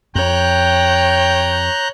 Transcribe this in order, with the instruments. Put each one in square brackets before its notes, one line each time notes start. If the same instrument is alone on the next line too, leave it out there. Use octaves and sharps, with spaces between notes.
[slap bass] F2 [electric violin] C#5 [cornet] G5 [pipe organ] A#5 F#6 G6